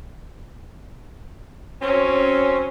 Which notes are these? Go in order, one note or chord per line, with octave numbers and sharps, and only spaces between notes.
F#3 C4 C#4